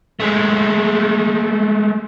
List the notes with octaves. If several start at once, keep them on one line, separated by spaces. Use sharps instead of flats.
G#3 A3